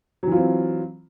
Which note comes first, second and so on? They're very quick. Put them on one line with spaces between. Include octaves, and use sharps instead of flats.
F#3 E3 F4 C4